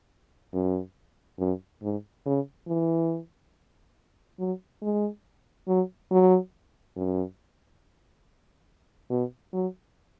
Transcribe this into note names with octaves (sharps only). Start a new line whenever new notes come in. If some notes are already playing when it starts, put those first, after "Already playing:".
F#2
F#2
G#2
C#3
E3
F#3
G#3
F#3
F#3
F#2
B2
F#3